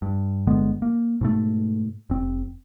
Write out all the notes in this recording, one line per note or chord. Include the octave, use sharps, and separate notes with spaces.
G2
G1 D3 G#3 B3
A#3
G#2 B2 A3
F1 C4